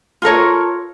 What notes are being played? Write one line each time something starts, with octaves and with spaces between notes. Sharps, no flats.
F4 A4 A#4 C#5